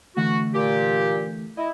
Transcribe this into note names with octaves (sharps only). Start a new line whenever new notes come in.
D3 E3 A3 F#4
A#2 G4
E4 D#5